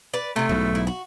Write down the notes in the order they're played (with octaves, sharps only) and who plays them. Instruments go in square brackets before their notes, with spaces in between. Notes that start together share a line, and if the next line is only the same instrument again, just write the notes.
[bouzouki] B4 D5
[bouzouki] C3 F4 [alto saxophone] A3
[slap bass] B1 G#2 [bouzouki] E4
[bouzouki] E4
F#4